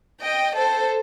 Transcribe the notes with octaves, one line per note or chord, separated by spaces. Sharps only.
D#5 G5
A4 C5